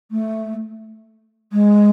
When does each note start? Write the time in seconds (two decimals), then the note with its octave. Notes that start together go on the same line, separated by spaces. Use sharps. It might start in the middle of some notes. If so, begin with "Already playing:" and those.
0.11 A3
1.52 G#3